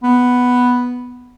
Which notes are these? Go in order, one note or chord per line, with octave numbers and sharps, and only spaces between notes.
B3